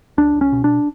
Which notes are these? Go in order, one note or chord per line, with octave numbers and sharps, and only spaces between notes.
C#2 D4
C#2
C#4
B2
D4